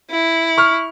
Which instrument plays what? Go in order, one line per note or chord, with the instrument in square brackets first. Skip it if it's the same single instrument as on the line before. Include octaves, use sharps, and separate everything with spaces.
[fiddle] E4
[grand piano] C#6 F6